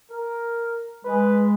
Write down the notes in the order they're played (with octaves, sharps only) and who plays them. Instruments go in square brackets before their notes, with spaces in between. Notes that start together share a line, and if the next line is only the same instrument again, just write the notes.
[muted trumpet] A#4
[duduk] G#3 [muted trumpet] B4